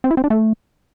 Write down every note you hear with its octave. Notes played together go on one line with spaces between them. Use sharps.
C4
E4
C4
D4
A3